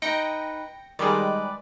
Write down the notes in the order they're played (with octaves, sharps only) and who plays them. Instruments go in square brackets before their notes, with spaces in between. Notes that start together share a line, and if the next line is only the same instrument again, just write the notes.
[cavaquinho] D#4 B4 [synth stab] G5 A#6 C#7
[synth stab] D#3 G3 G#3 [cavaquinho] B4 D5